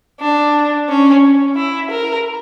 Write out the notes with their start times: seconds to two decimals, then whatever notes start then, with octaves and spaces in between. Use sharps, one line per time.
0.20 D4
0.89 C#4
1.56 E4
1.91 A#4